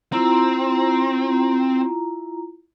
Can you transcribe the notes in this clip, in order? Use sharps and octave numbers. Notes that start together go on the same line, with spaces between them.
C4 E4 F4 A#5